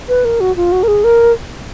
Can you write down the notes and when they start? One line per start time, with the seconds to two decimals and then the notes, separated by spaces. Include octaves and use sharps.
0.09 B4
0.25 A#4
0.40 F#4
0.56 F4
0.72 F#4
0.83 A#4
0.88 G#4
1.04 A#4